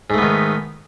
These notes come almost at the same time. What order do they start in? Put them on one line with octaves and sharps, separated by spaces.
G#2 A3 B3 D#3